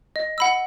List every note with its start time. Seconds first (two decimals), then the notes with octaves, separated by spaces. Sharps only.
0.16 D#5
0.38 F#5 B5 E6